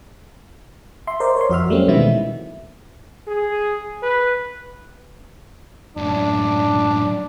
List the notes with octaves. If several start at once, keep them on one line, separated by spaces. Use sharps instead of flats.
E5 C6
A#4 C5 D5 D#5
C#5 C6
F2 F#4 E5 F6
F#3 G3 A3 A#3 C4 C#4
B2 D#3 E3 G#3 B3 E4
G#4
B4
F#2 A2 D4